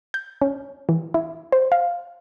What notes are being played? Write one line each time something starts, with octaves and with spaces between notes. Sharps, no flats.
G6
C#4
E3
E4
C5
F5